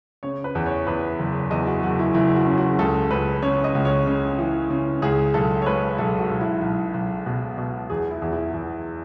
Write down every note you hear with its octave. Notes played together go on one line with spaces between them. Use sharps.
C#3 C#5
B4
E2
C#5
E2 B4
F#1
E2 D#5
F#4
F#1 F#4
E4
F#1 E4
F#4
C#3
F#4
C#2 A4
C#2 B4
C#3 C#5
D#5
C#2
C#5
C#3
E3
C#3
C#2 G#4
B1 A4
C#5
G#3 B4
B1 A4
F#4
B1
E4
B1
B1
B2
B2
E2 G#4
E4
E2
E4
E2